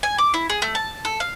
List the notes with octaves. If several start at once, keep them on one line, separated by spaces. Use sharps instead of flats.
G#5
D6
E4
G#4
A3
A5
A4
F5